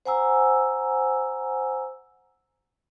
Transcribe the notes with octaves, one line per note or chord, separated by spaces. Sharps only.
C5 F#5 G#5 A#5 E6